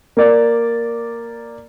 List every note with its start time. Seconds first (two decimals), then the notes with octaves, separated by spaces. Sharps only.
0.17 A#3 D5